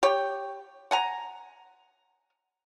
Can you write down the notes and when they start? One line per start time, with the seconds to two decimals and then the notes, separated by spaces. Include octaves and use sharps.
0.03 G4 C#5 G5
0.91 F#5 G#5 A#5